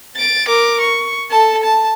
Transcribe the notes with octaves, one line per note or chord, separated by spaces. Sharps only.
A6 D7
A#4 D6
C#6
A4 A5
A5